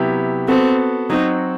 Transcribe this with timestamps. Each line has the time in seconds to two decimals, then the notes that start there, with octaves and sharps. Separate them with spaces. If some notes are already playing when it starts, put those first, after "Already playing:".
Already playing: C3 F#3 B3 E4 G4
0.48 B3 C4 F#4 A4
1.10 F#3 C4 D#4 F#4